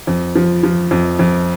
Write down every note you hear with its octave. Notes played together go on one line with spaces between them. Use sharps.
F2
F3
F3
F2
F2